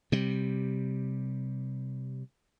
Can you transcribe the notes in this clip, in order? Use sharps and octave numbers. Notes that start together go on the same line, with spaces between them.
C3 G3